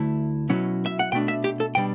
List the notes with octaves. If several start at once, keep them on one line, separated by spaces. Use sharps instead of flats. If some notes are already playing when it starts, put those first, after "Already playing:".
Already playing: D2 D3 A3 E4
B2 F#3 C#4 E4
E5
F#5
B2 A3 D4 G5
E5
G4
A4
B2 G3 D4 G5